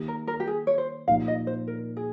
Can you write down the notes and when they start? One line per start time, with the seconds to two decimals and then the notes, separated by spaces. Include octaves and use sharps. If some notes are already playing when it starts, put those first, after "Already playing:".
Already playing: D#3 A#3 D#4 G4
0.08 A#4
0.27 A#4
0.40 G4
0.47 G#4
0.67 C#5
0.78 C5
1.08 A#2 F3 A#3 D#4 G4 F5
1.28 D#5
1.47 C5
1.67 A#4
1.97 G#4